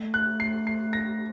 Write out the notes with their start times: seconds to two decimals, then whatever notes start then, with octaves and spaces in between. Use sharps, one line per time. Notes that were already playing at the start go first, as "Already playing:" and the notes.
Already playing: A3
0.14 F#6
0.40 C7
0.67 C7
0.93 A#6